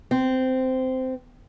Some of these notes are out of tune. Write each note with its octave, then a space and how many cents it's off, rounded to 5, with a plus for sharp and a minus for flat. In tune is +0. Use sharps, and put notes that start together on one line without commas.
C4 -15